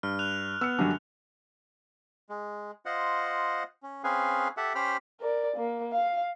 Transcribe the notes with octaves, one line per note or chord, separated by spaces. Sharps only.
G2 F6
F#6 F7
B3 E6 C#7
F#2 D3 G3 D4 F#4
G#3
F4 C5 D#5 F#5
C#4
C4 C#4 G#4 B4 F5 G#5
G4 A4 E5 F#5
C#4 G4 C5 G5 B5 F6
A#4 D5
A#3
F5